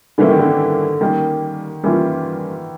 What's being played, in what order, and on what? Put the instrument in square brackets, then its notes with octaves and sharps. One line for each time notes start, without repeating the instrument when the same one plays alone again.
[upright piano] D3 [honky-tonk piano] E3 G3 A#3 C#4 E4
[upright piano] D#3
D3
[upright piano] D#3 [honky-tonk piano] G3 A#3 C#4
[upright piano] E3 [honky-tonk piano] G3 A#3 C#4 F4